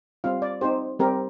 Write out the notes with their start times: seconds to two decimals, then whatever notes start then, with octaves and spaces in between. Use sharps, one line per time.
0.24 G3 C4 F4 F5
0.42 D5
0.61 C4 D#4 G4 C5
0.99 G3 C4 G4 A#4